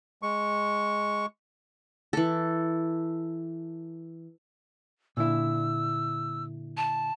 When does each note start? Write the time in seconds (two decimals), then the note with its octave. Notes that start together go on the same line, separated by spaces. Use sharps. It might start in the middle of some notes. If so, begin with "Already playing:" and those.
0.22 G#3 C#6
2.13 E3 A4
5.17 A#2 D3 E4 E6
6.77 A5